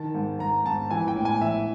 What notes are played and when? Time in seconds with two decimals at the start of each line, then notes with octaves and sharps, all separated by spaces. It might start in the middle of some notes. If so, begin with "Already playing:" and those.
Already playing: D#3 A5
0.15 G#2
0.39 G#2 A#5
0.66 G#2 A5
0.90 E3 G#5
1.08 G5
1.16 A2
1.25 G#5
1.42 E3 E5